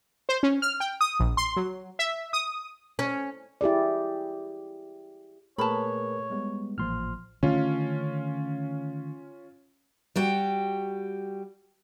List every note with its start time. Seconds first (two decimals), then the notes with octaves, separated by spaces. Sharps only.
0.29 C5
0.43 C#4
0.62 F6
0.80 G5
1.01 D#6
1.20 A#1
1.37 C6
1.56 F#3
1.99 E5
2.33 D#6
2.99 C#4
3.61 E4 G4 G#4 D5
5.58 A#2 A3 G#4 A#4 B4 C#5 A5 B5
6.30 G3 G#3 B3
6.78 A1 A#2 F3 C6 F6
7.43 D3 D#3 A3 C#4 F4
10.16 G3 F#4 G5